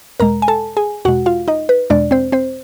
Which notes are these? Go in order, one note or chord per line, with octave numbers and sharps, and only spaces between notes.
E2 B2 G#3 A#4 A#5
G#5
A4 A5
G#4 G#5
E2 B2 G#3 F#4 F#5
F4 F5
D#4 D#5
B4
E2 B2 G#3 D4 D5
C4 C5
C4 C5